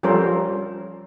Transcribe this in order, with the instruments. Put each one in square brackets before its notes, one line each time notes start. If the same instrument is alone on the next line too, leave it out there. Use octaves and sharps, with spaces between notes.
[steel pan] F3 G3 C#4 A4 A#4 C5